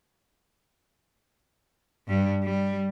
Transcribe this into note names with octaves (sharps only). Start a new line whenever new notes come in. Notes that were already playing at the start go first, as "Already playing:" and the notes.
G2 G3
G3